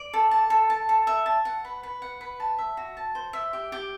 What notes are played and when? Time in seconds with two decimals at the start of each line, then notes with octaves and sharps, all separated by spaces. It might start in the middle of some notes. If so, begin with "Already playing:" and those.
Already playing: D5
0.14 A4
0.31 A5
0.50 A4
0.70 A5
0.89 A4
1.07 E5
1.26 A5
1.45 F#5
1.65 B4
1.83 B4
2.02 F#5
2.21 B4
2.40 A5
2.58 E5
2.77 F#4
2.97 A5
3.15 C5
3.33 E5
3.53 G4
3.72 G4